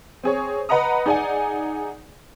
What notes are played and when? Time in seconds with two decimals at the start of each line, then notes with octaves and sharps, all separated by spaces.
0.24 C4 G#4 C#5
0.69 B4 D#5 F#5 A#5 D#6
1.06 D#4 G#4 D5 F#5 G#5